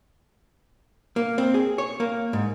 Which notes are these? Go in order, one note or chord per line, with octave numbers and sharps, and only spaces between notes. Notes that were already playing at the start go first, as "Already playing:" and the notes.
A#3
C4
G#4
C#5
A#3
G#2